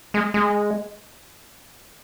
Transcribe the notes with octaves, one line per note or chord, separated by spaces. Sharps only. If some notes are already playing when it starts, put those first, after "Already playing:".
G#3
G#3